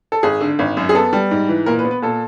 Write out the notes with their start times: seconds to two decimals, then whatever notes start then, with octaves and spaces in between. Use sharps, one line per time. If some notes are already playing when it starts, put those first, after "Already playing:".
0.12 A4
0.23 G#1 G#4
0.41 D3
0.59 G#1
0.77 F#2
0.89 G#4
0.95 B3 A4
1.13 G3
1.31 G#2
1.49 E3
1.66 A#2 A#4
1.79 B4
1.85 B3
1.91 B4
2.02 A#2 A4